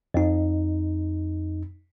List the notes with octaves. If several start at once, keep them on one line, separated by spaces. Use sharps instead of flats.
F2 D#4